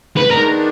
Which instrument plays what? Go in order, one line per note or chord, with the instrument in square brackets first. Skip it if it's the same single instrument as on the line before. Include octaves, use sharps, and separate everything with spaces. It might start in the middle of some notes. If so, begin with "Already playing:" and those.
[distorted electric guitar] B4
[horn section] D#3 G#3 B3 D4 [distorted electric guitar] A#4